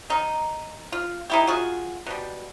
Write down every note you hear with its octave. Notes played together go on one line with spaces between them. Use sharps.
D#3 D#4
F4
D#4 E4 G4
F4 F#4 G#4
B2 G3